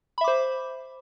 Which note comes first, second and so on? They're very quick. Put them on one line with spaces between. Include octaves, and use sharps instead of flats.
B5 E5 D6 C5